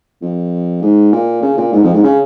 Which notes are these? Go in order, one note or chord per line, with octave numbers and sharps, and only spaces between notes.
F2
G#2
A#2
C#3
A#2
G#2
F2
G#2
C#3